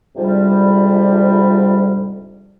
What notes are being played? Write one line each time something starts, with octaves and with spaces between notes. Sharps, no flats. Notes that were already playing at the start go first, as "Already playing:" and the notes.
D2 G#2 C3 F3 G3